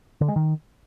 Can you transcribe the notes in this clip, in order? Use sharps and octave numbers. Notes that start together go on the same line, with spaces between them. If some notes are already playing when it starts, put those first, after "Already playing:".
D3
G#3
D#3